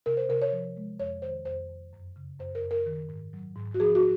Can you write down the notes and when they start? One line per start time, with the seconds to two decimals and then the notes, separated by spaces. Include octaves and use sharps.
0.06 C3 A#4
0.17 C5
0.29 C3 A#4
0.42 C#5
0.52 F3
0.77 G#3
0.99 F2 C#5
1.22 D#3 C5
1.45 F2 C5
1.69 F2
1.93 F#2
2.16 C#3
2.39 F#2 C5
2.55 A#4
2.63 F#2
2.71 A#4
2.86 D#3
3.09 G#2
3.33 F#3
3.56 G#2
3.74 F#4
3.80 F3 G#4
3.95 F#4